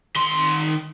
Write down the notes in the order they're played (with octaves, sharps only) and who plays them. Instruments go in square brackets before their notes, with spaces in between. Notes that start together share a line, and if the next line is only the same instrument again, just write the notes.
[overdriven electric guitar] D#3 C6